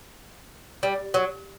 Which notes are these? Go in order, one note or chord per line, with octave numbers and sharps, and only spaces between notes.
G3
F#3